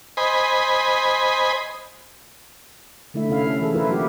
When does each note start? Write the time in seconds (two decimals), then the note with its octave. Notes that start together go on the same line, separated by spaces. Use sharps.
0.17 C5 D#5 G#5 B5
3.14 D3 A3 E4 E5
3.28 C3 C#4 E4 F5
3.46 C#4 A4
3.60 E3 G#4 A4
3.75 E4 F4 A#4 B4
3.88 F#3 A#3 F#4 G4